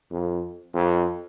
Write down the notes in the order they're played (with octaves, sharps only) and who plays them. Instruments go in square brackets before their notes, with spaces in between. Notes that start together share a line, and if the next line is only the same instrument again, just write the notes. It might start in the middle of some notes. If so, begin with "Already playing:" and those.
[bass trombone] F2
F2